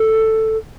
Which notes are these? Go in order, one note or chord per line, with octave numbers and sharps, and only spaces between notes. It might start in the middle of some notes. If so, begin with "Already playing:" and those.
Already playing: A4